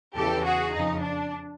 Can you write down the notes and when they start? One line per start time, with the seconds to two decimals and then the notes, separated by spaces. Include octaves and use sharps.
0.16 E2 C#3 E3 G4 A4
0.45 F#4 G#4
0.74 F2 C#3 F3 D#4
1.02 D4